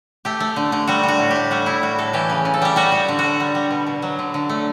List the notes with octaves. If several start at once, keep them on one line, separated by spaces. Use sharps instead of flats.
A3 G4
A3
D3
D3
G3 F#4
G3
F#4
A2
G4
A2
G3 F#4
G3 E4
A2 F#4
A2 A4
E3 G4
C#3
C#3
A4
G3 G4
G3 F#4
G3
D3
D3 F#4
G3
G3
B2
B2
F#3
D3
D3
A3